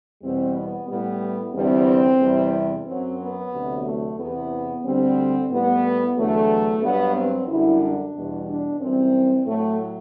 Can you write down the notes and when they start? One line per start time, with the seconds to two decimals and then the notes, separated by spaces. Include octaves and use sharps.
0.22 E2 B2 G3 C4
0.55 B3
0.88 A2 G3 B3
1.54 E2 D3 G3 C4
2.21 E2 C3 G3
2.86 F#2 F#3 C4
3.19 B3
3.53 D2 C3 F#3
3.86 A3
4.18 E2 C3 E3 B3
4.84 D2 D3 G3 C4
5.50 A2 G3 B3
6.16 E2 D3 F#3 A3
6.82 G2 F#3 B3
7.15 C4
7.48 F#2 D3 G3 E4
7.82 D4
8.14 E2 B2 G3
8.47 D4
8.81 F#2 E3 G3 C4
9.46 A2 F#3 A3